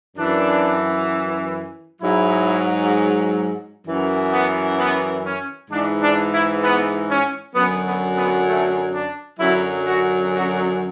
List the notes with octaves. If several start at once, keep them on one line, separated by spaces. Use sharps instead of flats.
F#2 E3 D4
G#2 F#3 E4
F#2 E3
B3
B3
C#4
G#2 E3 D4
D4
E4
B3
C#4
F#2 D3 F#3 B3
B3
B3
A3
D4
F#2 D3 F#3 E4
F#4
F#4